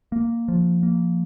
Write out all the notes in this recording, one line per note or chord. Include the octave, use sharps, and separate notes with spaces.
A#3
F3
A#3